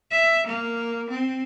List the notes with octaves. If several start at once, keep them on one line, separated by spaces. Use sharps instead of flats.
E5
A#3
C4